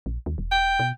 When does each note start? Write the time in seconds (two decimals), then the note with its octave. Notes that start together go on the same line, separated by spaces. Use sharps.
0.06 A#1
0.26 D#2
0.38 E1
0.52 G5
0.79 B2